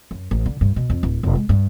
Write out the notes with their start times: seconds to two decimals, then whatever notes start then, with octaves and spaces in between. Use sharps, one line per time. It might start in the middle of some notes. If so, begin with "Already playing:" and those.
0.11 F#2
0.31 A1
0.46 D3
0.61 G2
0.76 B2
0.90 F2
1.03 D1
1.23 F1
1.35 G#3
1.49 G2